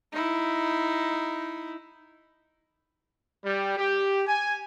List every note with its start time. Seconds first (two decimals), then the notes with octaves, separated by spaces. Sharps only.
0.12 D#4 E4
3.45 G3
3.78 G4
4.27 G#5